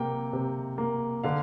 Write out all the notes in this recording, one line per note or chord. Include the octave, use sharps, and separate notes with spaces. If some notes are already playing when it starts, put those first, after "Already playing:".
Already playing: C3 A#3 G5
C3
A#3
D3 F5